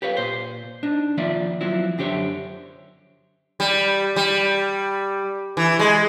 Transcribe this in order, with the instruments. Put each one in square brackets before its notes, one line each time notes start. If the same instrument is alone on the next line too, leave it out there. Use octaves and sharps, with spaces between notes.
[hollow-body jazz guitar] G4 B4 C#5 F5
A#2 C5
D4 D#4
D#3 F3 A#3 D5 E5
F3 F#3 C4 E4
F#2 D3 G4 C5 C#5 E5
[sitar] G3
G3
E3
G#3